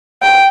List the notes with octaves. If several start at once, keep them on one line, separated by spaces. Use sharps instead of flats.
G5